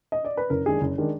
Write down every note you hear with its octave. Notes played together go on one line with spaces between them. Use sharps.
D#5
D5
B4
F#1 A#4
F#2 D#3 G#3 D4 G#4
F#1
D#3 G#3 D4